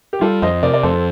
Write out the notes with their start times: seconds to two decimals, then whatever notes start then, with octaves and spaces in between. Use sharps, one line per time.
0.13 G4
0.21 G3 F4 A4
0.42 F2 C5 D#5
0.63 C3 A#4 D5
0.74 D5
0.83 F2 A4 C5